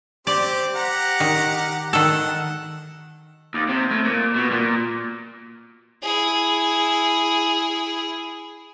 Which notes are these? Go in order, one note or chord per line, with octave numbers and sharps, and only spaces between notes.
C4 G4 C5 D5
G4 F#5 A#5
D#3
D#3 A4 F#5
D#2
C3
A2
A#2
B2
A#2
E4 G#4